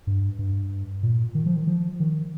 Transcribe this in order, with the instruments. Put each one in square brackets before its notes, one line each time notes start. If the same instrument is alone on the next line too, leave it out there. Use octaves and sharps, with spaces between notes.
[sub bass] G2
G2
A#2
D#3
F3
D#3
F3
D#3